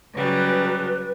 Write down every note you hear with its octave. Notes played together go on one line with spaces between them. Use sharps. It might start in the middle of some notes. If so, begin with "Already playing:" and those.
C#3 F#3 G3 B4